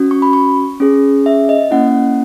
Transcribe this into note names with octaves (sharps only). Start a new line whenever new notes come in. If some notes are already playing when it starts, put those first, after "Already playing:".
Already playing: C#4 F#4
C#6
B5
C#6
C#4 G#4
E5
D#5
A#3 C#4 E4 F#5